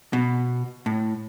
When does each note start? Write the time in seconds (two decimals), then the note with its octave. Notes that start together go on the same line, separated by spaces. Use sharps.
0.13 B2
0.86 A2